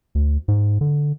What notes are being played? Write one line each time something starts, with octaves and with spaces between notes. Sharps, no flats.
D2
G#2
D3